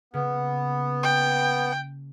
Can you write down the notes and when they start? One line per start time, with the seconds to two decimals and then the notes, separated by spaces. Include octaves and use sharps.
0.14 C#3 A#3 B3
1.03 G5